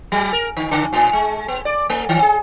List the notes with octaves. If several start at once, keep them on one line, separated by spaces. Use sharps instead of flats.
F#3
A#4
D3
C#3
A2
G#3
B3
D5
A3
D#3
G#4